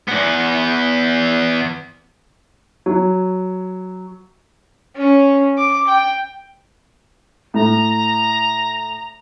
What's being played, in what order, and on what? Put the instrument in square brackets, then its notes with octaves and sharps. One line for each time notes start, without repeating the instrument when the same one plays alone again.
[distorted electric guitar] E2 B3
[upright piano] F#3
[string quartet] C#4
D6
G5
[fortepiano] A2 [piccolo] A#5